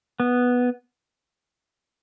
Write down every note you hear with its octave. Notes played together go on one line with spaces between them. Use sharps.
B3